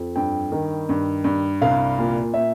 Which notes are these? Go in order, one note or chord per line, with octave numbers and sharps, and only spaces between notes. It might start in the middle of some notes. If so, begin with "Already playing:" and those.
Already playing: F2
G2 G5
D#3
G2
G2
C2 F5
A#2
A#2 E5